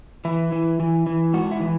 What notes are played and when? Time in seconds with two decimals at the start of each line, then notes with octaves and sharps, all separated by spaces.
0.25 E3 E4
0.52 E3
0.80 E3
1.07 E3
1.33 G#2 F#4
1.51 E4
1.60 E3